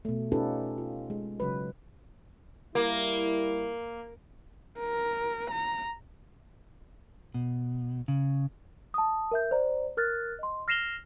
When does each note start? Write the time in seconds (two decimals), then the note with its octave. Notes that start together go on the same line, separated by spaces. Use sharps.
0.05 B2 A3
0.32 C#4 D#4 F4 G4 A4 B4
0.78 F4
1.10 G#3
1.40 C#3 F#3 B4
2.75 G3 A#3 E4
4.79 A#4
5.51 A#5
7.34 B2
8.08 C#3
8.94 A5 D#6
9.31 A#4 E5 G6
9.51 C5 D5 A#5
9.97 A#4 F6 F#6 A6
10.39 D#5 C6
10.68 F6 A#6 C7 E7 F7 G7